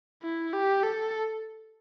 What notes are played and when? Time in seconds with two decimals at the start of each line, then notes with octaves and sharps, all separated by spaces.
0.23 E4
0.53 G4
0.84 A4